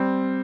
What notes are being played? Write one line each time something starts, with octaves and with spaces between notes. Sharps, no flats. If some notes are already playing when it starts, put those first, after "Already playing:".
Already playing: G3 C4